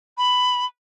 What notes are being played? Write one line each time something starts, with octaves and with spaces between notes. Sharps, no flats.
B5